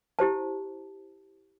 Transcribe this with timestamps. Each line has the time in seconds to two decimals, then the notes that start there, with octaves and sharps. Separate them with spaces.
0.19 E4 G4 C5 A5